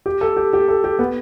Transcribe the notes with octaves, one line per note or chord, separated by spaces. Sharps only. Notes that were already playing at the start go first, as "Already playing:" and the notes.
G4
A4
G4
G4
A4
G4
B3